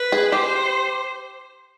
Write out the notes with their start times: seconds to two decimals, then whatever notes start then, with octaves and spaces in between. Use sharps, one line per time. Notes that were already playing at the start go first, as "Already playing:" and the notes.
Already playing: B4
0.12 G#4
0.32 G4 C5